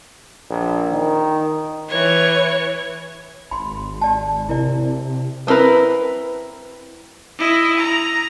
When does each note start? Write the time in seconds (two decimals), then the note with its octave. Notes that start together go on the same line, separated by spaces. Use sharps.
0.50 A#1
0.92 D#3
1.89 E3 C#5
3.51 G#1 B5 C6
4.01 G4 D5 A5
4.49 C3 E4 A#4 D5
5.47 B3 C4 E4 A#4 B4
7.38 E4 D#5
7.77 A#5